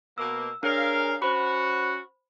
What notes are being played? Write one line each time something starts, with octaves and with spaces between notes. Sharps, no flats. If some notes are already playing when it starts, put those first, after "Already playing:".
B2 A#3 E6
D4 G#4 A#4 C#5 F5
C#4 F#4 C5 B5